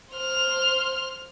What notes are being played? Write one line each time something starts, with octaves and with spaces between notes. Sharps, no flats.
C5 F6